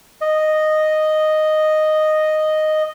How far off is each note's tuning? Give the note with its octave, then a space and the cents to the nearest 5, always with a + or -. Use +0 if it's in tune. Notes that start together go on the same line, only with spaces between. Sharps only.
D#5 -5